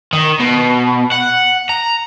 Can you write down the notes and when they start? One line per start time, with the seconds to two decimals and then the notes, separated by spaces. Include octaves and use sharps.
0.13 D#3
0.40 B2
1.12 F#5
1.69 A#5